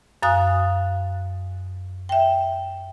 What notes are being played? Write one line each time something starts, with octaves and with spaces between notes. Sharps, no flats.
F#2 F5 G#5 D#6 F#6
E5 G5